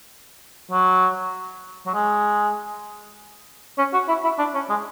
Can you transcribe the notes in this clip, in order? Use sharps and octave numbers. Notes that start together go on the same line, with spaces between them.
F#3
F#3
G#3
C#4
F#4
E4
E4
D4
C#4
G#3